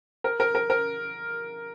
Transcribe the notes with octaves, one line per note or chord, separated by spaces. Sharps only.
A#4
A#4
A#4
A#4